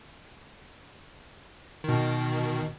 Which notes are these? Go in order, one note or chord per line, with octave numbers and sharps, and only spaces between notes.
B2 D#3